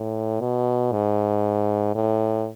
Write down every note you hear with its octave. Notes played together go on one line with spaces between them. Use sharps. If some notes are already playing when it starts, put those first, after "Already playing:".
Already playing: A2
B2
G#2
A2